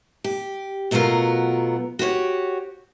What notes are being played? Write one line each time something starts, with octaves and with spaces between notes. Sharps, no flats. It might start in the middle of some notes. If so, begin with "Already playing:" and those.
G4
B2 F#3 A3 B3 F4 A#4
F#4 G4 C5 C#5